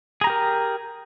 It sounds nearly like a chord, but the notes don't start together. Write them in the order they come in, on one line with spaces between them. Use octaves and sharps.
G#4 A#5 G4 A#4